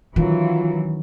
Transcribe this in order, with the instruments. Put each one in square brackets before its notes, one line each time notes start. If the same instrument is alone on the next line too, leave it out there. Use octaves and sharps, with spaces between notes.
[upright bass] D#3 C#4 [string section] E3 F#3 [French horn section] F4